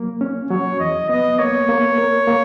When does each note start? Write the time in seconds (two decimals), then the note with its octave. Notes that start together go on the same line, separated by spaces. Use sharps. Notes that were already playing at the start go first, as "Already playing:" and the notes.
Already playing: F#3 A#3
0.21 C#4
0.50 F#3 C#5
0.80 E2 D#5
1.09 B3 D#5
1.39 A#3 C#5
1.69 A#3
1.98 A#4
2.27 A#3